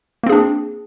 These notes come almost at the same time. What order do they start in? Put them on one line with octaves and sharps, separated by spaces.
A#3 C4 G#4 D4